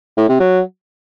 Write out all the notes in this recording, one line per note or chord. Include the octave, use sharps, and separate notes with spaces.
A2
C3
F#3